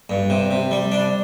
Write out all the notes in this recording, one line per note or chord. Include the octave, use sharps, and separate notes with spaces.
G2
C3
C3
G3
D4